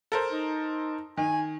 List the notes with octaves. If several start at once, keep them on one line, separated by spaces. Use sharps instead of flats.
A4 A#4 C5
D#4
D#3 G#5